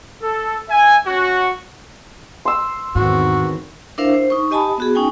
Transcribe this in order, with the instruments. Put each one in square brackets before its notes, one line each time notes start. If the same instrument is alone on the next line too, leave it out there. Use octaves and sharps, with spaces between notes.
[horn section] A4
E5 G#5
C#4 F#4
[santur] C6 E6
[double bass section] E2 D#3 C4 [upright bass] G#2 [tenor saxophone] F#4
[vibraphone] D4 E4 A#4 C5 E5 F5
C5
D#4 C#6
G4 D#5 G#5 A5 B5 D#6
B3 F#4 G#4
C#4 D#4 G5 G#5